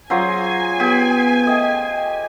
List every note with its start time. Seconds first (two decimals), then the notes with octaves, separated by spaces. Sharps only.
0.10 F#3 C#4 F4 G#4 C5 G#5 D#6
0.80 B3 G4 G#4
1.46 A3 D#5 G5